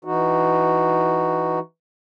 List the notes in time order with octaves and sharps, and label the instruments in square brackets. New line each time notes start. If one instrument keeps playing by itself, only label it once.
[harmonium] E3 D#4 F#4